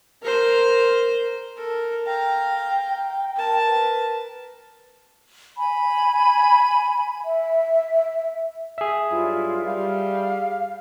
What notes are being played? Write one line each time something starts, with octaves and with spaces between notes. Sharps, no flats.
A#4 C5
A4 A#4
F5 G5 A#5
A#4 A5
B4
G#5 B5
E5
G#4 E5
G2 F#3 E4 F4
G3 F5